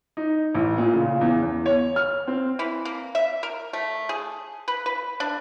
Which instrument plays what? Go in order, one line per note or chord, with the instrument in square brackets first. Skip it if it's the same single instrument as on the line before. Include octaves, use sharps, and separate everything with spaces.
[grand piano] D#4
A1
A#2
C#3
E2
E2
C#5
F6
C4
[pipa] E3
A#3
E5
A#4
A3
G#4
B4
B4
D4